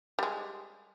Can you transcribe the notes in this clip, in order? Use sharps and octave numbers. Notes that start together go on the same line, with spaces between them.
G3 G#3